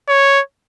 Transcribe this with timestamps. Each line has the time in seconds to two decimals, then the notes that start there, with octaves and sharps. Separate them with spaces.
0.08 C#5